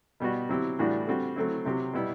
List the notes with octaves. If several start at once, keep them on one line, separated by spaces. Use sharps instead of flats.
B2 G3 B3 F#4
F#3 C4 E4 G4
A2 E3 G3 D4 F#4
D3 G3 C4 F#4
F#3 A3 C4 E4
C3 F#3 C4 G4
B2 G3 B3 E4